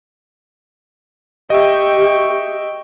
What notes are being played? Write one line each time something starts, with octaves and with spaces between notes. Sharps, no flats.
G4 D#5 E5 G5 C#6